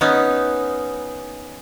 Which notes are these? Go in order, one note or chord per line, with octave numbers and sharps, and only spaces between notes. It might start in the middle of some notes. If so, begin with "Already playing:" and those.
B3 C#4 D#4